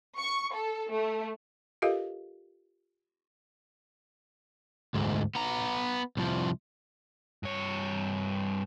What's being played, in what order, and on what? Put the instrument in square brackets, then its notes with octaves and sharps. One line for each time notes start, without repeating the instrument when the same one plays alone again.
[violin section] C#6
A4
A3
[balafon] F4 G4 A4 A#4 D#5 F5
[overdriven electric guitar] D2 G#2
B3 A#5
C2 F3
[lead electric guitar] G2 C#5